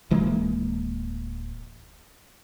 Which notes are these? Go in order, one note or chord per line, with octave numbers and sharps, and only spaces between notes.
D1 E3 G#3 A#3